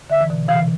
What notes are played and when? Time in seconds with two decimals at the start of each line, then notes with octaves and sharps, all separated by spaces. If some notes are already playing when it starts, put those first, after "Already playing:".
0.10 D3 E5
0.21 E3
0.30 B2 D3
0.48 C3 E3 F5